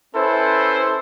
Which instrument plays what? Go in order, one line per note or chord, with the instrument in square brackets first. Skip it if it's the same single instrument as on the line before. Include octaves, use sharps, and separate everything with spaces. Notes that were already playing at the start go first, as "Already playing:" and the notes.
[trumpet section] C#4 E4 A4 B4 C5